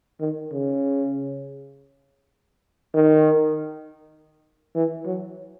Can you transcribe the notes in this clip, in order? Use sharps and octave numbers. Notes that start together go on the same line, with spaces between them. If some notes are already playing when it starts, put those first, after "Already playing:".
D#3
C#3
D#3
E3
F#3